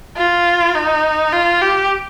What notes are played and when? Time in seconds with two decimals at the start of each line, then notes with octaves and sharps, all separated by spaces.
0.17 F4
0.75 D#4
1.32 F4
1.61 G4